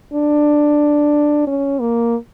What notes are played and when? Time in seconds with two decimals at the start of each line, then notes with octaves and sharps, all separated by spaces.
0.14 D4
1.47 C#4
1.81 A#3